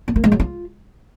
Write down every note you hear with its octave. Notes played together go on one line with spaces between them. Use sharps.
B3
A#3
G#3
F#3
F4